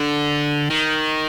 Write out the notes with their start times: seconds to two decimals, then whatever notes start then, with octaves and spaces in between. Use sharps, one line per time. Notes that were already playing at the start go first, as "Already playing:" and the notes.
Already playing: D3
0.70 D#3